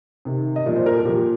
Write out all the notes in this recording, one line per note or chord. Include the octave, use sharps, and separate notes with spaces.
C3 D#3
D#5
A#2 F3 D5
C5
A#4
A4
A#2 F3 G4